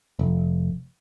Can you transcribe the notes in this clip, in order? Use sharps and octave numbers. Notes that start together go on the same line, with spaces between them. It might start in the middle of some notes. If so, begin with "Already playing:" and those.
F1